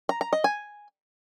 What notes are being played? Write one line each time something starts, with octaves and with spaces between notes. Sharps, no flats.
A#5
A#5
D#5
G#5